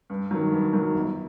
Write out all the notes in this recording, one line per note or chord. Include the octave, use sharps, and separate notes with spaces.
G2
D#3 F#3
G2
D#3 F#3
G1